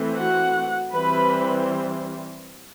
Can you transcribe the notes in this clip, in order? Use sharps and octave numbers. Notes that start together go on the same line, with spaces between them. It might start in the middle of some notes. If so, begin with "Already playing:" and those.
Already playing: E3 A3 C4
F#4 F#5
E3 G3 C4 B4 B5